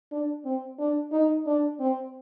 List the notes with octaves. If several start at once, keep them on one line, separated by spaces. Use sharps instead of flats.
D4
C4
D4
D#4
D4
C4